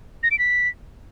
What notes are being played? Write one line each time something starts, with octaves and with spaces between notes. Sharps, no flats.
A#6
D7
B6